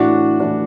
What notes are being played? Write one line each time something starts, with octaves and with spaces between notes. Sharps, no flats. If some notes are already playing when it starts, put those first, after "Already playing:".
Already playing: A2 E3 D4 F#4
A2 E3 D4